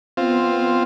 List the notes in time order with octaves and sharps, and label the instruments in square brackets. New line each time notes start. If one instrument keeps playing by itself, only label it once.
[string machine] B3 [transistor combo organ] C4 F4